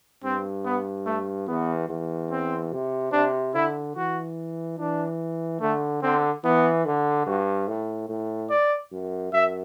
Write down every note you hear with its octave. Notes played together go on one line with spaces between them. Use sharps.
G2 C4
B3
A3
E2 B3
E2
C4
C3
C3 D4
D3 E4
E3 F#4
E3 D4
D3 A3
D3 C4
E3 B3
D3
G2 F#4
A2
A2
D5
F#2
F#2 E5